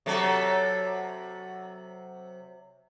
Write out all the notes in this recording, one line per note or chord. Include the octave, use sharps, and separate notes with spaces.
C3 F#3 A4